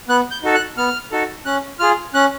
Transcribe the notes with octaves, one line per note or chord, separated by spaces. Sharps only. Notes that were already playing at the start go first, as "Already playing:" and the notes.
B3 F#6
G6
D#4 F#4 A4
F#6
B3 F6
D#4 F#4 A4
C#4 F#6
F4 G#4 F6
C#4 F#6